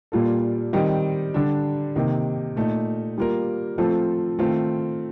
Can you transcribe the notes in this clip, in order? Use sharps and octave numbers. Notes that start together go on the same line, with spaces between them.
A#2 G3 A#3 F4 A4
D#3 G3 C4 D#4 G4
D3 G3 D4
C3 D#3 A#3 D#4
A#2 A3 D#4
G3 A#3 F4 A#4
F3 A3 C4 F4 A4
D#3 A3 C4 F4